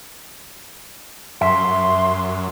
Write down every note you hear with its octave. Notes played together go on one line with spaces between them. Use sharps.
F#2 E5 C6